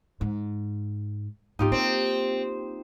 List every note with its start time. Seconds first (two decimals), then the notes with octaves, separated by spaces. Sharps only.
0.21 G#2
1.59 G#2 B3 D#4 F4 G4
1.72 A#3 C4